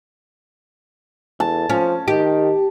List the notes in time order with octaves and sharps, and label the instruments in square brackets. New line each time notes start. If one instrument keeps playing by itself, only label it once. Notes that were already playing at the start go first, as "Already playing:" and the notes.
[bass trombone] E2 [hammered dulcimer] A5
[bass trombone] F3 [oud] C#4
[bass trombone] D#3 [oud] G4